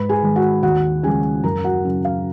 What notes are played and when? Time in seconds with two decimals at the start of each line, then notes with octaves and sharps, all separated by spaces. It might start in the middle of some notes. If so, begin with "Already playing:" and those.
Already playing: G#2 B4 B5
0.09 G#4 G#5
0.22 D#3 G#3
0.36 F#4 F#5
0.63 D#2 F#4 F#5
1.03 C#3 F3 G#3 G#4 G#5
1.44 F#2 A#4 A#5
1.64 F#4 F#5
1.84 C#3 F#3
2.05 F5